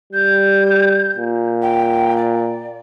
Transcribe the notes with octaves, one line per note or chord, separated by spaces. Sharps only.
G3 G6
A#2
G5
D5